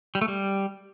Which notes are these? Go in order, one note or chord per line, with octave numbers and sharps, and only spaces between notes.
G3
A3
G3